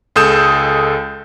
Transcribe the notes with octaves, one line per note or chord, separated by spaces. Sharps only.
C#2 G#3 A4 D#6 G6 E7